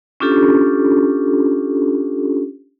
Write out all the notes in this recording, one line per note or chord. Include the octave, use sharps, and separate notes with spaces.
C#4 D4 F4 G4 A4